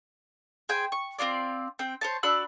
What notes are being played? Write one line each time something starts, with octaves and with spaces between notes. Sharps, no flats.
G#4 C5 G5 G#5
C#6
C4 D4 F4 D5
C4 G5
C5 C#5 A5
D4 F#4 B5 E6